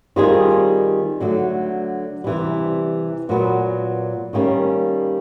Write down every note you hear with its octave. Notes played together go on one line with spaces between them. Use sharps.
D#3 G3 C4 F4 G#4
D3 F#3 A3
C3 E3 G3
A#2 F#3 B3
D#3 G3 A#3 C#4